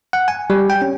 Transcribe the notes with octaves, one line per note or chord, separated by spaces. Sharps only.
F#5
G#5
G3
G5
C#4